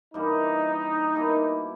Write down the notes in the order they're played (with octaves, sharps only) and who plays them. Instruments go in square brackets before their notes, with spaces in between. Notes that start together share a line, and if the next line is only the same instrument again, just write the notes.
[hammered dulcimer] G2 E3 G3 A#3 [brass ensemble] D#4
[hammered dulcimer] B2 A#3 E4 G4